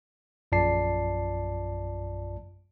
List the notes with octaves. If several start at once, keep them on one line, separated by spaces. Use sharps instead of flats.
A#1 F#2 F4 D5 A5 C7